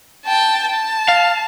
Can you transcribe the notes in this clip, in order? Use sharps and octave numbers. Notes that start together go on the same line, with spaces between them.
G5 A5
A5
F5